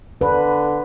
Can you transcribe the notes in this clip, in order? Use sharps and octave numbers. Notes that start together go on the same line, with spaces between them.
D3 B4